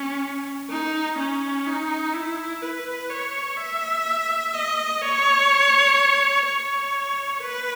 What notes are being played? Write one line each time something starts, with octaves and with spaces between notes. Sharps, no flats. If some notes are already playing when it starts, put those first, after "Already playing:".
Already playing: C#4
D#4
C#4
D#4
E4
B4
C#5
E5
D#5
C#5
C#5
B4